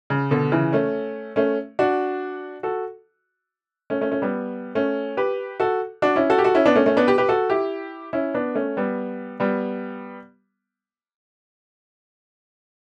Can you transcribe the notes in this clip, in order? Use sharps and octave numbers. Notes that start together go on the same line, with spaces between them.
C#3
B2 D3
C#3 E3
A3 C#4
A3 C#4
D4 F#4
F#4 A4
A3 C#4
A3 C#4
A3 C#4
G3 B3
A3 C#4
G4 B4
F#4 A4
D4 F#4
C#4 E4
F#4 A4
G4
F#4 A4
C#4 E4
B3 D4
A3 C#4
A3 C#4
B3 D4
G4 B4
G4 B4
F#4 A4
E4 G4
C#4 E4
B3 D4
A3 C#4
G3 B3
G3 B3